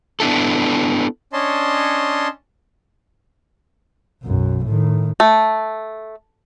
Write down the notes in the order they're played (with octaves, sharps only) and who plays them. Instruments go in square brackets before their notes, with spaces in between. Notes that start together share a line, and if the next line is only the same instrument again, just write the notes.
[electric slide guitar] B3 D4 E4 A4
[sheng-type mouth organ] C#4 D4 C#5 D#5 A5 C6
[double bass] B1 F#2
A2 D#3
[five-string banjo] A3